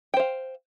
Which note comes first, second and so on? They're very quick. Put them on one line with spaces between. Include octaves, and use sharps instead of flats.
G5 C5 F5